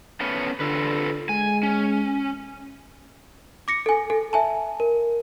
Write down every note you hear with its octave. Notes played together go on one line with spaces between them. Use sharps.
A3 B3 C#4
D3 F4 A4 B4
G#3 G#5
C#4
D6 A#6 C#7
A4 G#5
A4
E5 G#5 A5
A#4